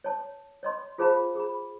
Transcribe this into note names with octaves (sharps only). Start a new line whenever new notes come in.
C#5 A5
C#5 D#5 C6
F4 G#4 C5 F5 A5 B5
G#4 B5